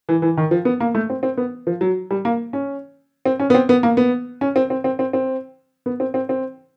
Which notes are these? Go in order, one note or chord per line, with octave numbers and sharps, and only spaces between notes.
E3
E3
D#3
F3
B3
A#3
A3
C4
C4
B3
F3
F#3
G3
A#3
C#4
C4
C#4
B3
C4
B3
A#3
B3
C#4
C4
C4
C4
C4
C4
B3
C4
C4
C4